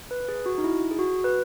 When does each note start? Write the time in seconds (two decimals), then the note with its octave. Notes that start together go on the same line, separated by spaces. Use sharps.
0.11 B4
0.28 G#4
0.46 F#4
0.58 D#4
0.64 E4
0.91 G#4
0.99 F#4
1.24 B4